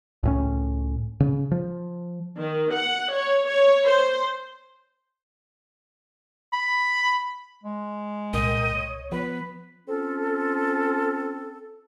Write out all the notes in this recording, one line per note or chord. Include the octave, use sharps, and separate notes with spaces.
C#2 A2 C#4
C#3
F3
D#3
F#5
C#5
C#5
C5
B5
G#3
C2 A#2 A#4 D#5 G5
C#5
F3 B3 B4
C4 C#4 F4 A4